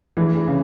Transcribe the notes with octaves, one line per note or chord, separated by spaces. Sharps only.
E3 A3 D4 G#4
C#3